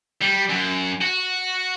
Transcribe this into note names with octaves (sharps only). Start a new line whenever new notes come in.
G3
F#2
F#4